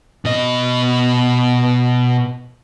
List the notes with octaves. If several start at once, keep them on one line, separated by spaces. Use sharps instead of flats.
B2 D#5